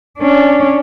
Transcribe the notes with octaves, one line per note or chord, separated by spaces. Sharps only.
C#4 D4